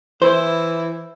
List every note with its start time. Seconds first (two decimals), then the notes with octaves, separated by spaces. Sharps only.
0.22 E3 E4 C5